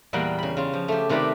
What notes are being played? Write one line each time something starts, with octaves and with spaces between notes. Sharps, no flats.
E2 A#2 G3 A#3 F#5 G5
C#3 B5
C#3 F4
F3
A3 G4
C3 D#3 A3 B4 D5 B5